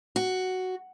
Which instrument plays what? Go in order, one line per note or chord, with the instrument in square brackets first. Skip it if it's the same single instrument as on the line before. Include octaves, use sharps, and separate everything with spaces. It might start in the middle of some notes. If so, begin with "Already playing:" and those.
[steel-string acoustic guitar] F#4